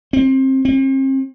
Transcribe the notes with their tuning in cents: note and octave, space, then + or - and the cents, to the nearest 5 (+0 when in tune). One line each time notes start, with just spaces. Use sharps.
C4 +25
C4 +40